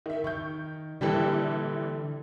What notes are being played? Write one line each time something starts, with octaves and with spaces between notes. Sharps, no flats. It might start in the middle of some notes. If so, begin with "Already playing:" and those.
D#3 E5
D#3 C#6 G6
A#1 D3 E3 G3 G4 A4